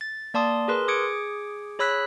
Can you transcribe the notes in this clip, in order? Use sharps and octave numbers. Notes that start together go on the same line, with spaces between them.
A6
A#3 D5 A5 C6 D#6
G#4 A#4 B4 C6
G#4 D6 D#6 G#6 C#7 D7
G#4 C#5 B5 E6 F#6 B6